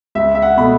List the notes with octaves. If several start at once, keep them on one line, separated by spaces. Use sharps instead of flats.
C#2 E5
E5
F#5
B2 A3 B5